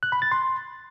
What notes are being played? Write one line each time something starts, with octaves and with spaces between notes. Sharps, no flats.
F#6
B5
A6
C6